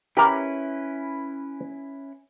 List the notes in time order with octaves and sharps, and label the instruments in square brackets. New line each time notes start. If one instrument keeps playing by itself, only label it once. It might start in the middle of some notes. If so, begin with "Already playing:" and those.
[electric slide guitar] C#4 E4 B4 [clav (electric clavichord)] G4 A#4